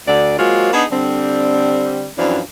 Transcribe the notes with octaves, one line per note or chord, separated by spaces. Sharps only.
D2 D3 D5
F#3 G#3 A#3 C4 F4 F#4
B3 D4 D#4 G#4
D3 G3 C4
F#2 E3 F3 G3 C4 D4